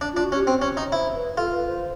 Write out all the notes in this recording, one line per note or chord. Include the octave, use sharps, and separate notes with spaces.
D4
F4
D4
F#4
C#4
G4
C4
C#4
D#4
E4 C5
B4
F4 A4
B4
C5